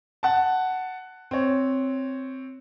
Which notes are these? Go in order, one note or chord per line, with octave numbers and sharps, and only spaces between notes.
F#5 A5
C4 C#5